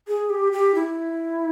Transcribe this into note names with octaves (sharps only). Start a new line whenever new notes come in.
G#4
G4
G4
E4